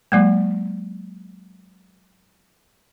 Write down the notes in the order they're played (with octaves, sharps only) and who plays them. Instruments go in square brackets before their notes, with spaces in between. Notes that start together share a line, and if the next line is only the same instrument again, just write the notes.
[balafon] F#3 G#3 A#3